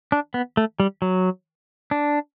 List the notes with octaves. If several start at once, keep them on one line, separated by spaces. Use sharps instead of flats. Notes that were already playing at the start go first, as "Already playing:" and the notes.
D4
B3
A3
G3
F#3
D4